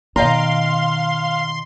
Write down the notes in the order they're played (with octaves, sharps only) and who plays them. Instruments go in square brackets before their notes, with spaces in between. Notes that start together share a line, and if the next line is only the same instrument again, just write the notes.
[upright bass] B2 D#3 [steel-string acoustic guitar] D#5 G5 A#5 [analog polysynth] F5 [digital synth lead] C6